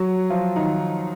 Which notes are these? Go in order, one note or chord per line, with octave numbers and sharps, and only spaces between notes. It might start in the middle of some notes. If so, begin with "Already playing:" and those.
Already playing: F#3 F#4
F3 F4
D#3 D#4